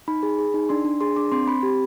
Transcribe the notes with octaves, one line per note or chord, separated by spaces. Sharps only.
D#4 B5
G#4
G#4
D#4
D4 C6
D4
G#4 C6
D4 D6
C4 C6
C4 B5
G4